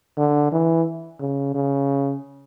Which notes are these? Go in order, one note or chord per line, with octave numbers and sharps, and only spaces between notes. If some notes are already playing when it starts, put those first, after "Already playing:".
D3
E3
C#3
C#3